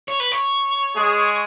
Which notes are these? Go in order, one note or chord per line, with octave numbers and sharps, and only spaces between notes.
C#5
B4
C#5
G#3 G#4